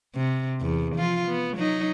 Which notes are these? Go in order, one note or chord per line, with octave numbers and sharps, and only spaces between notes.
C3
E2
F3 F4
B3
F#3 D#4